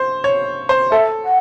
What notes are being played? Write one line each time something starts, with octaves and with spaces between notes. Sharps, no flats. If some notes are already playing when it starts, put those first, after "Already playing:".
Already playing: C5
C#5
C5
A4 E5
F#5